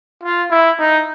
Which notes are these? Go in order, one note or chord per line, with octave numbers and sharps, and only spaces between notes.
F4
E4
D#4